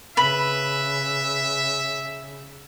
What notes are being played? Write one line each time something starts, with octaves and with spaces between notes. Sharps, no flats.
C#3 B4 E5 B5